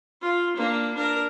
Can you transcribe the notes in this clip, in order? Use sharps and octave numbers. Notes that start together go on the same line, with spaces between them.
F4
A#3 D4
D4 A#4